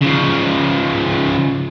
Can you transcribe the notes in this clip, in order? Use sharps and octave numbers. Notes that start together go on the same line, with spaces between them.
C#3 F3